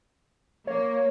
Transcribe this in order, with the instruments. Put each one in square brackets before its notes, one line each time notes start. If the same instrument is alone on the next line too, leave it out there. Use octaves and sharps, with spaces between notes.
[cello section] A#3 [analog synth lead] C#5